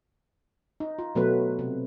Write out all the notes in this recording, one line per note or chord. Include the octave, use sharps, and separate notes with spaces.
D#4
F4
B2 F#3 A3 B3 B4
C3